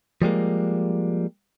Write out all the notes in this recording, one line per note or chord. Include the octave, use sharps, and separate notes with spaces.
F3 G3 G#3 A#3